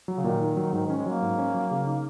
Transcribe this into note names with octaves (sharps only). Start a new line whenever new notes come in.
F#3
C#3
A#2 D#3
D#4
F#3
G#2 D#3
D#3 C#4
G#3
F#3 A#3
G#2
C#4
F#3
C#3
D#4